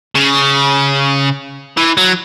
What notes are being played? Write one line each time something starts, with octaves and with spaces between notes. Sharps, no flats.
C#3
E3
F#3